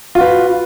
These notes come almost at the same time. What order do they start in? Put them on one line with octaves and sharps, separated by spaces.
F4 F#4 B4